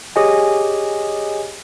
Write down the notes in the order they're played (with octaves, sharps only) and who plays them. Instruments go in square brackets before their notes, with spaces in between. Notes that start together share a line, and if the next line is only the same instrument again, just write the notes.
[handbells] G4 G#4 C#5 D#5 G#5